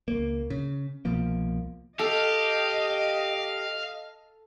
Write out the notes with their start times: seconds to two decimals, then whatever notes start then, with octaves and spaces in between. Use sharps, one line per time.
0.08 C#2 A#3
0.50 C#3
1.05 C2 B2 F3 A#3
1.99 G4 A4 D#5 F5